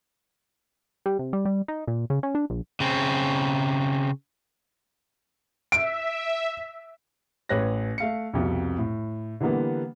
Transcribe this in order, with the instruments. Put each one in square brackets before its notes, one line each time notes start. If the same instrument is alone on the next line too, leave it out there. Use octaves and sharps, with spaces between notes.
[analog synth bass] G3
C3
G3
G3
D#4
A#2
C#3
C#4
D4
A#1
[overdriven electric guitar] C#3 C4
[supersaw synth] E5 [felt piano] D7
[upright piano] A1 B4 C#5 F#6 A#6
A3 F5 C#7
C2 F2 B2
A2
D3 E3 G3 A#3 B3